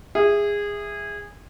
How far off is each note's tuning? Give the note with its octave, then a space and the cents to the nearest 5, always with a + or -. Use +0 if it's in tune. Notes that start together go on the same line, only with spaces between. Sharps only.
G#4 -20 E5 +0